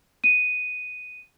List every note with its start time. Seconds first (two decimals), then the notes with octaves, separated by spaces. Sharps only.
0.24 D#7